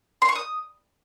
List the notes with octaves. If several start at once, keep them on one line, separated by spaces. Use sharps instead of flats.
C6
C#6
D#6